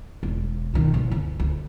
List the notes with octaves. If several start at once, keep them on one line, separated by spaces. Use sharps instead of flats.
E1
B2 D#3
F#1 E3
D2
D2